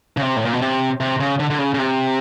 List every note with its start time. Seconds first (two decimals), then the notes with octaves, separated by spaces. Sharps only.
0.17 C#3
0.22 C3
0.37 A2
0.45 A#2
0.53 B2
0.61 C3
1.00 C3
1.20 C#3
1.40 D3
1.50 D3
1.59 C#3
1.74 C#3
1.79 C3